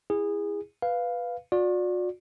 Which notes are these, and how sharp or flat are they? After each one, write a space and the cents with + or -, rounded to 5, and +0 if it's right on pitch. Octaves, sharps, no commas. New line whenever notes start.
E4 +0 G#4 -20
B4 +0 F5 +0
F#4 -45 D5 +0